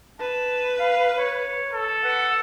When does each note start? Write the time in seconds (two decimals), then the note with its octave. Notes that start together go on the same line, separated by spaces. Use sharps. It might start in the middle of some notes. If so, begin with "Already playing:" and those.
0.20 B4 A5
0.79 F5
1.16 C#5
1.74 A4
2.04 B4 F#5